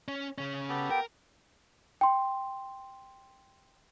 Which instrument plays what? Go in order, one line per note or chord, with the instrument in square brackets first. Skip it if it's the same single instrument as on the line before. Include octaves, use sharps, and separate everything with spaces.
[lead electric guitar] C#4
C#3 C#4
[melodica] B3 G4 A4
[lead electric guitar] A#4 [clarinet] G5
[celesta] G5 C6